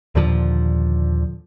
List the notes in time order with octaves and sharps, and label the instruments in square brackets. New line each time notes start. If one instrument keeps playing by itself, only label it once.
[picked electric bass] D#2 A#2 D3 F3